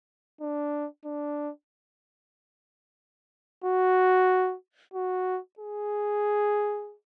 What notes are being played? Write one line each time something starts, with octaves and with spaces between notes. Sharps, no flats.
D4
D4
F#4
F#4
G#4